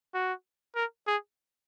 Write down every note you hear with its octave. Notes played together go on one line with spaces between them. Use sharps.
F#4
A#4
G#4